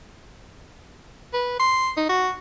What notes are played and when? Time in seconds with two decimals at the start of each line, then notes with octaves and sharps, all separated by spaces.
1.33 B4
1.60 C6
1.97 D#4
2.09 F#4